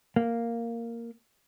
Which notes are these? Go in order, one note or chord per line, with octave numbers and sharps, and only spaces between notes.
A#3